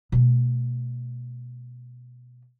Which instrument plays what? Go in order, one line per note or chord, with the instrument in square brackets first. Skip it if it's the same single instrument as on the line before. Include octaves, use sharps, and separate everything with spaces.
[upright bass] B2 A3